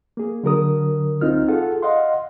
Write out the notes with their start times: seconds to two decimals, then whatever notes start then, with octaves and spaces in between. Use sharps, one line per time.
0.17 A#3 G#4
0.43 D3 F#3 A#4 D#6
1.21 C#2 C4 D#4 F4 F6
1.48 F4 G#4 A4 F#5
1.82 D#5 F5 F#5 C6